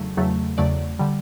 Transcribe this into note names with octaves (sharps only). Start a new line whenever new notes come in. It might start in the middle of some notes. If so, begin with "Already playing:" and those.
Already playing: E2 C#3 F#3 A3
E2 C#3 F#3 A3
E2 C#3 F#3 A3 D5
D3 G3